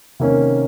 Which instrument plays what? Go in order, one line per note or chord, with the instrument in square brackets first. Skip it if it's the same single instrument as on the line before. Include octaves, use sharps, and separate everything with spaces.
[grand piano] C3 D#3 A#3 C#4